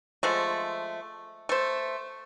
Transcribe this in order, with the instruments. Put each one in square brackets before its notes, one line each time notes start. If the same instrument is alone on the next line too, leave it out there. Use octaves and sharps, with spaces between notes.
[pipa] F3 G#3 A3
A3 C5